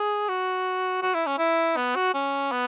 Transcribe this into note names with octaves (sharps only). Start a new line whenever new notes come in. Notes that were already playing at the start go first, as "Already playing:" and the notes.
Already playing: G#4
F#4
F#4
E4
C#4
E4
B3
F#4
C#4
B3